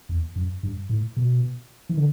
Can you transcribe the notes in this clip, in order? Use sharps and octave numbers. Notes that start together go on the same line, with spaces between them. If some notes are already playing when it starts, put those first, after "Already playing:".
E2
F#2
G2
A2
B2
E3
D3